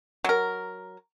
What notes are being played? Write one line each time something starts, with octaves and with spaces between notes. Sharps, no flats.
F#3 A#4